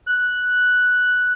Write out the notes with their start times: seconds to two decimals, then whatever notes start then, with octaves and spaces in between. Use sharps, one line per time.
0.07 F#6